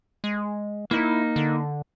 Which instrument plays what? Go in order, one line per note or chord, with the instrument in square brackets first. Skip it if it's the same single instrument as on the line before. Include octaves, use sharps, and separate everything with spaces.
[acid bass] G#3
[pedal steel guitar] A#3 D#4 [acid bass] E4
[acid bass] D3